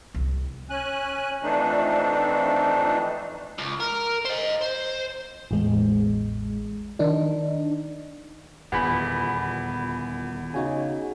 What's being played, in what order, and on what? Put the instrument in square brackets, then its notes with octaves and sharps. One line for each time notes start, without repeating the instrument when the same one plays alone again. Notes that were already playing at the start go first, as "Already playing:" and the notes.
[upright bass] C2
[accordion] C#4 G#5 F#6
F2 E3 A3 D4 D#4
[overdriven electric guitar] C#2
A#4
C5 D#5
C5
[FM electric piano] A1 E2 G#3
D#3 D4 D#4
[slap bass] D#1 A#2 D3 [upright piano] E2 [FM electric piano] F#5 B5
[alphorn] C#3 [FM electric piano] D#4 F#4 G#5